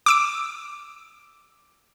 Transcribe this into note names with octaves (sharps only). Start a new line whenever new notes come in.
D6 E6 D7